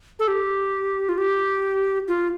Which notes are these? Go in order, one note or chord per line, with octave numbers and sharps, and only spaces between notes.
A4
G4
F4
G4
F4